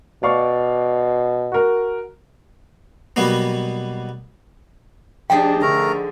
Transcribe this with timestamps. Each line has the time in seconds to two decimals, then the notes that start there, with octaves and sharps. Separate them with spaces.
0.23 B2 D5 F5 C#6
1.52 F#4 A#4
3.16 B2 F#3 G3 A#3 B3
5.30 F3 D4 D#4 G4 G#4 G5
5.62 D3 A3 A#4 A#5